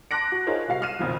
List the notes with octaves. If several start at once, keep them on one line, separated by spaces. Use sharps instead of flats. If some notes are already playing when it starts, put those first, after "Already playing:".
A5 C6 D6 F#6 A#6 D7
F#4
D#4 F4 G#4 A#4 C5 C#5
C2 F#4 F5 C7
F6 F#6 C7 D#7 E7
F#1 B1 F2 D#3 F3